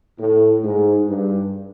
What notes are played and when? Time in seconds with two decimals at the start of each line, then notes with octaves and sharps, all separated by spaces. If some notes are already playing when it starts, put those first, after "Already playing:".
0.20 A2
0.64 G#2
1.07 G2